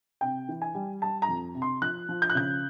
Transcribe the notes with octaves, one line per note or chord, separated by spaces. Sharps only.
C3 G5
E3
G#5
G3
G3 A5
A#5
F2
C3
C6
F3 F#6
F3
G6
F#6
C#3 G6